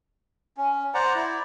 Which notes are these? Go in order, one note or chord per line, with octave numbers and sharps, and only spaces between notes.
C#4
C5 D5 F#5 A#5
E4 D5